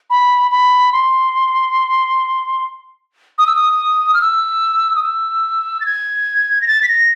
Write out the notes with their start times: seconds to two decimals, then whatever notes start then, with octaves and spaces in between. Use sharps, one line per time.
0.10 B5
0.51 B5
0.93 C6
3.38 D#6
3.47 E6
3.55 D#6
4.14 F6
4.22 E6
4.96 D#6
5.03 E6
5.80 A6
5.86 G#6
6.62 A#6
6.68 A6
6.83 B6
6.88 A#6